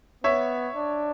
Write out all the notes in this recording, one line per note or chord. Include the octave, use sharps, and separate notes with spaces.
B3 C#5 E5
D4